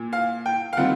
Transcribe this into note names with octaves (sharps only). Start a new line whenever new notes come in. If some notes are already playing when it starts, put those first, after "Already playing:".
Already playing: A#2
F5
G5
F5
C3 D#3 G3 C4 F4 F#5